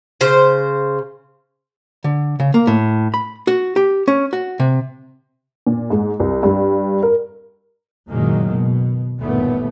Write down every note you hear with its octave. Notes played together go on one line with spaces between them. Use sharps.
C#3 C5
D3
C#3
A#3
A2
B5
F#4
G4
C#4
F#4
C3
A#2
G#2
C2
G2
A#4
F#1 A#2 D#3 F#3 G#3 A#3
B2
G1 D#2 A#2 A3 B3